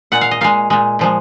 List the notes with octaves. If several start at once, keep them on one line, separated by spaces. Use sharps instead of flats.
A#2 G#3 F#5
F5
D#5
A#2 G#3 F5
A#2 G#3
A#2 F3 G#3